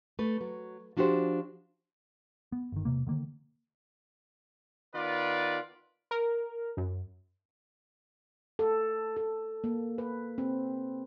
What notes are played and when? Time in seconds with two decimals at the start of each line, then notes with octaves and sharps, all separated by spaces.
0.19 A3 B4
0.41 F#3
0.97 F3 D4 F#4 G4 C5
2.52 B3
2.72 G1 D#3
2.85 E1 A#1 C3 A#3
3.07 D3 D#3 A#3
4.94 D#3 B3 F4 B4 D5
6.11 A#4
6.77 F#2
8.59 A4
9.16 A4
9.64 A#3
9.98 B4
10.38 C4